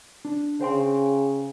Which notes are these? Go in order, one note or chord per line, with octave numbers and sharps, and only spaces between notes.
D4
C#3 C5 G5 C6